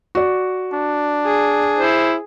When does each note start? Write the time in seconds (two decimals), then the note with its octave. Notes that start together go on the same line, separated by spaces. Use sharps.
0.15 F#4 D5
0.73 D4
1.26 G#4
1.78 E4 C5